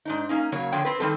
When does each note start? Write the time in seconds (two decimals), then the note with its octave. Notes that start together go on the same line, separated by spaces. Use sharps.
0.05 G#2 D4 D#4
0.29 A#3 C#4 D#4
0.52 C#3 F#3 A#3 C#5
0.72 F2 D3 F3 C#5 G5
0.85 C4 B4
1.00 D#3 G3 C4 A4